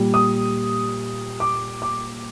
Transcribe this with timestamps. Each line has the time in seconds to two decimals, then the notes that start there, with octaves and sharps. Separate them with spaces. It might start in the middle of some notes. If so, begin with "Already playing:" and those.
Already playing: A#2 G3
0.14 D#6
1.40 D6
1.82 D6